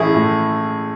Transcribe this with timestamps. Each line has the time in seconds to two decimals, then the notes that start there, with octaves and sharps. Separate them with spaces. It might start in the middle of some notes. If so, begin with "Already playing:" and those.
Already playing: A1 E4 G#4
0.14 A2